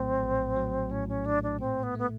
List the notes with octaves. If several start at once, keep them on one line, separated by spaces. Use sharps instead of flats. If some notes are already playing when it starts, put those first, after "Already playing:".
Already playing: A#1 A2 F#3 A3 C4
A#1
F#3
A2 C#4
C#4
A3 D4
D4
A#2 C4
B3
A3 B3